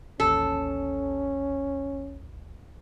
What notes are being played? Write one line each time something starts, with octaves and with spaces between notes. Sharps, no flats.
A1 D#2 C#4 A4